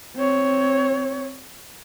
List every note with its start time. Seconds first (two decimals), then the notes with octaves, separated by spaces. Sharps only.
0.16 C4 C#5